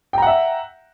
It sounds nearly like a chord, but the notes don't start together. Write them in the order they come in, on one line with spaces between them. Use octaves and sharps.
G5 A#5 F#5 E5